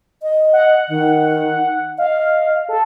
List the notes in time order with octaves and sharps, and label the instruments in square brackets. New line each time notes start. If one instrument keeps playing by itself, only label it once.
[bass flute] D#5
[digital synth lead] F#5
[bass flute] D#3
[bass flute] D#5 [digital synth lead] F5
[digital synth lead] A4